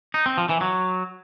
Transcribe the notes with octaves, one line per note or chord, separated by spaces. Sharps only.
D#4
C4
F3
E3
F#3